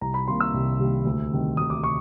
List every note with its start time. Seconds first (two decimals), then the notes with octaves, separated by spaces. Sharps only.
0.01 C2 A#5
0.14 B5
0.27 C3 D#3 G3 A#3 C6
0.40 E6
0.54 C2
0.79 C3 D#3 G3 A#3
1.05 D2
1.32 C3 D#3 G3
1.57 D2 D#6
1.70 D6
1.84 C3 C#6